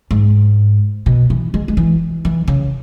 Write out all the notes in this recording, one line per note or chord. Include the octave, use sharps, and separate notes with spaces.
G#2
B2
E3
G#3
G#3
E3
E3
C#3